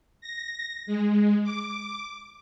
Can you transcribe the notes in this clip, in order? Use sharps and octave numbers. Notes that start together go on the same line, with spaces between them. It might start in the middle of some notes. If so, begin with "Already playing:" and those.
A#6
G#3
D6